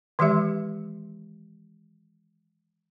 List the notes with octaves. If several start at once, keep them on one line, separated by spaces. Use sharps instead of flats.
D#3 E3 G#3 G4 E5